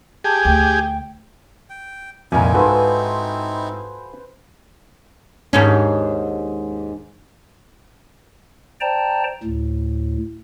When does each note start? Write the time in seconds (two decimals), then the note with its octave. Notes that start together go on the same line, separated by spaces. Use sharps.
0.24 G4 G#4 A5
0.45 D2 G5
1.70 G5
2.32 C2 F2 A#2 C4 D#4 E4 A#4 G#5
2.55 G#2 F4 F#4 A4 B4 C5
5.53 D#2 G#2 C#4
8.81 C5 D5 G5 A5 A#5
9.43 D2 A2